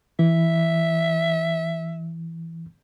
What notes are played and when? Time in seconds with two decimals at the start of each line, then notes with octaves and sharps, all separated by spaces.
0.19 E3 E5